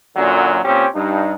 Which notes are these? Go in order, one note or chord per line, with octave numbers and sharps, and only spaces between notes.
F#2 A#2 D3 F#3
A#2 C4 C#4 G4
G2 D#4